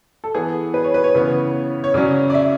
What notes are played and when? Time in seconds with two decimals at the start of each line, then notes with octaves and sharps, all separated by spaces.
0.24 A4
0.34 E3 B3 G#4
0.74 B4
0.84 C#5
0.94 B4
1.04 C#5
1.15 C#3 E3 B3
1.84 C#5
1.94 C#3 F#3 C#4 D5
2.30 D5
2.34 E5